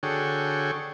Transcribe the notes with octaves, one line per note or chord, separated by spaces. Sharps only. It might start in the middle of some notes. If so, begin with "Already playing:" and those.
D3 F#4 G#4 A4 C#5 G5